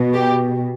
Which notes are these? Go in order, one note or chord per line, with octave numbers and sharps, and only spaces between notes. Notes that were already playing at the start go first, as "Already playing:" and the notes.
Already playing: B2
G4